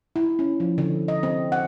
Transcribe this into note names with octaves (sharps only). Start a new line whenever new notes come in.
E4
C#4
F3
D3
D#5
C4
F#5